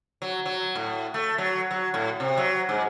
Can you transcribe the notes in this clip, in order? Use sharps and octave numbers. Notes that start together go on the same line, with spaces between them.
F#3
F#3
A2
A3
F#3
F#3
A2
C3
F#3
G#2